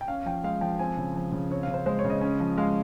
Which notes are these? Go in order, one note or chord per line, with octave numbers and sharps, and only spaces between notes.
G5
C#4 F5
F3 G5
G#3 F5
F3 G5
C4 G#5
C#3
F3
C#3
C4 C#5
C#3 F5
C5
G#3 C5
C#5
C#3
D#5
C#4
F3
G#3 F5